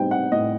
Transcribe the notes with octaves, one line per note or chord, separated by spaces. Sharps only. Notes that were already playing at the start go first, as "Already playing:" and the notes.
Already playing: A2 G3 C4 D#4 G5
F#5
A2 D#5